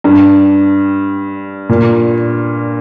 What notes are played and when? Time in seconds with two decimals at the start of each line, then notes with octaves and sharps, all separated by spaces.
0.04 G2
1.69 A#2